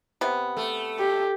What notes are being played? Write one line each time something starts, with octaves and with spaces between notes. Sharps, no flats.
C3 B3
A3
G4